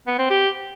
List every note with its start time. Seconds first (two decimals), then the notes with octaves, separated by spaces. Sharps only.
0.07 B3
0.19 C4
0.30 G4